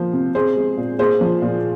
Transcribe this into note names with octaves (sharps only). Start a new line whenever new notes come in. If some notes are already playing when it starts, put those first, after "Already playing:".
Already playing: F3 A#3 C5
C3
C4 G#4 C5
G#3
A#2
A#3 G#4 C5
F3
A#2